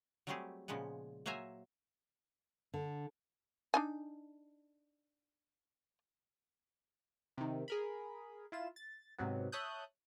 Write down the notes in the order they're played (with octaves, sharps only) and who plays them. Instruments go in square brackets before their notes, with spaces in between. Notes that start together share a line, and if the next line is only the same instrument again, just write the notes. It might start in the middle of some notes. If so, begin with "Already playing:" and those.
[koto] F#3 G3 A3 C4 G4 G#4
A#2 C#3 F3 G#3 B3
F#3 A#3 C5 E5 G#5 A#5
[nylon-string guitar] D3
[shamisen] D4 D#4 G#5
[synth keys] C3 D#3
G#4 A#4 B5
E4 F4 E7
A6
G#2 C3 F#3 B3
C#5 E5 A5 D#6 F#6 G6